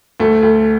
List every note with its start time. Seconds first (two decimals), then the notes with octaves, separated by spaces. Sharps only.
0.20 D2 A3
0.43 D2